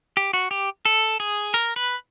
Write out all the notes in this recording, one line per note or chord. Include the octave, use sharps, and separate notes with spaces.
G4
F#4
G4
A4
G#4
A#4
B4